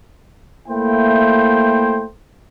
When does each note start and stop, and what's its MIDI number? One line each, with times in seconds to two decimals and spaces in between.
0.68 2.04 57
0.68 2.04 58
0.68 2.04 64
0.68 2.04 72
0.68 2.04 79